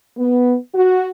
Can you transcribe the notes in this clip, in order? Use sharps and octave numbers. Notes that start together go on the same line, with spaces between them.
B3
F#4